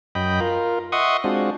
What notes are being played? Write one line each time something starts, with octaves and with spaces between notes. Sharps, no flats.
F#2 D#5 G5 B5
F4 A#4
D#5 E5 F#5 C6 C#6 D#6
G#3 C4 D4 F4 F#4